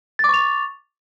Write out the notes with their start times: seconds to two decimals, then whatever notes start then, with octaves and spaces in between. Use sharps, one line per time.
0.19 A6
0.24 D6
0.29 C#6
0.34 F7